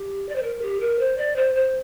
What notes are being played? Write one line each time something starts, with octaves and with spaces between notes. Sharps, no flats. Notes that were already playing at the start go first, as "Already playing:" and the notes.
Already playing: G4
D5
C5
A#4
G4
A#4
C5
D5
C5
C5